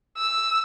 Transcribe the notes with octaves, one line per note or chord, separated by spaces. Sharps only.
E6